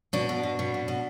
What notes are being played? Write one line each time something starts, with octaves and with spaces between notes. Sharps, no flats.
B2 D4
B2
B2
B2
B2
B2